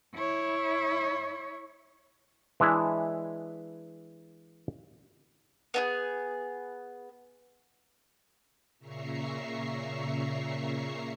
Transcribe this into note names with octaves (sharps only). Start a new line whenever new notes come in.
E4 C#5
E3 G#3 D4 E4
B3 D#4 G#4
A#2 C#3 E5 A#5 C#6 C7